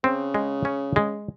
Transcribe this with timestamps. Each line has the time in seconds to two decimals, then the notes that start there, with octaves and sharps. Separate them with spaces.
0.04 C#3 C4
0.34 G#3
0.65 C#4
0.96 G#3